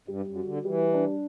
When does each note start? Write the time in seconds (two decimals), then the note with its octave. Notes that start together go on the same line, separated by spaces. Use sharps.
0.08 G2 G3
0.27 F#2
0.36 F#4
0.45 D3
0.65 E3 G3
0.94 D4